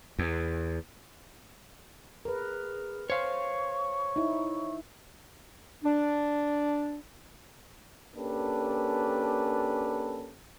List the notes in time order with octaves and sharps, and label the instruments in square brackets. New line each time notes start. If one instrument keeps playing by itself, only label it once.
[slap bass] E2
[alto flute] G#4 [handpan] A#4 B4
[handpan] C5 [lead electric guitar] C#5 F5 [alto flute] C#6
[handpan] D#4 E4
[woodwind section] D4
[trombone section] A#3 C#4 D4 G4 A4 B4